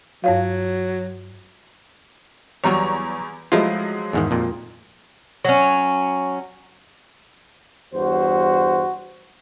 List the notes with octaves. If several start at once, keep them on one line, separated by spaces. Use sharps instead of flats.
G2 F#3 C#5 F5
E2 F#3 G3 C#5 A#5 C#6
F3 F#3 G#3 A3 E4 F4
E2 G#2 D#3
F2 A#2
F#3 C#4
E2 G2 F#4 C5